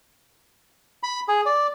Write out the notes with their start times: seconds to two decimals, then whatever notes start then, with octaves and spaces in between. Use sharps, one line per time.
1.03 B5
1.28 G#4
1.46 D5